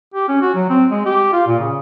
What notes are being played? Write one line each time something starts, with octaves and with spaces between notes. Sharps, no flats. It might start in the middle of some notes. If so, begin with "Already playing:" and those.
G4
C#4
F#4
F#3
C4
G#3
G4
F4
A#2
C#3